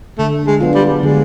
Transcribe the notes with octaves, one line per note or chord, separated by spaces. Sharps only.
D3 A3
G#3
F#3 B3 D4 F4
G3
D3 G#3